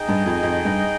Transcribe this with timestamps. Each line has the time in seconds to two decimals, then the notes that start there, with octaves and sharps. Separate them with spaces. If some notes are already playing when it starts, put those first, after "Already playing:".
Already playing: D#4 G#4 D#5 G5
0.09 G2
0.26 F2
0.43 F2
0.65 G2